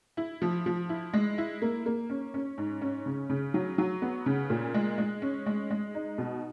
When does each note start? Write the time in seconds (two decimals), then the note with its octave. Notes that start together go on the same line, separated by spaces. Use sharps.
0.17 E4
0.42 F3
0.66 F3
0.89 E4
1.13 G#3
1.38 E4
1.62 A#3
1.86 A#3
2.10 C#4
2.34 C#4
2.58 G#2
2.82 C#4
3.06 C#3
3.30 C#3
3.54 F#3
3.78 F#3
4.02 B3
4.26 C#3
4.50 A#2
4.74 G#3
4.98 G#3
5.22 C#4
5.46 G#3
5.70 G#3
5.95 D#4
6.18 B2